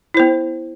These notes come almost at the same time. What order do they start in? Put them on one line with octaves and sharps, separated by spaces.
E4 C5 B3